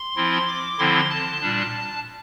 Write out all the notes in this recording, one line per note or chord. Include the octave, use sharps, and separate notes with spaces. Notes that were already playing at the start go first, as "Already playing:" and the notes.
Already playing: C6
F3 C4 E4
D6
D3 F3 C4 E4 C6
A5
A#2 G3 D4